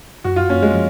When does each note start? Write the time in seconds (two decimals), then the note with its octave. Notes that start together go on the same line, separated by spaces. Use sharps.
0.24 F#2 F#4
0.36 F4
0.50 A#3 C#4
0.62 G#3
0.74 F3